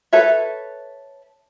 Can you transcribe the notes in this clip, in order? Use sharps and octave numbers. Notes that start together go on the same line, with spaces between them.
A4 B4 C#5 E5